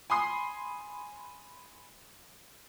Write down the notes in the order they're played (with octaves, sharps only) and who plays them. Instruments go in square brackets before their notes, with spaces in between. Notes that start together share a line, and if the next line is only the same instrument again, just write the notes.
[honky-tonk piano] G#5 B5 C6 D#6 C7